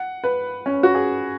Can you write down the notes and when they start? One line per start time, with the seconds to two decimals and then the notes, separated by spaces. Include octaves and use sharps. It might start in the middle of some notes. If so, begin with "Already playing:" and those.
Already playing: F#5
0.24 B4
0.66 C#4
0.83 F#4
0.95 G#4